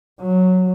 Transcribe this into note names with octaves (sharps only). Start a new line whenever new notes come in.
F#3